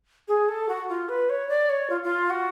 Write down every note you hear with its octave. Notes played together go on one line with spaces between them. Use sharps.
G#4
A4
F#4
F4
B4
C#5
D5
C#5
F4
F4
F#4